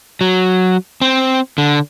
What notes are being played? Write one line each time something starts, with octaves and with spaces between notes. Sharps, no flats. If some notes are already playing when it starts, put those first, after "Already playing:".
F#3
C4
D3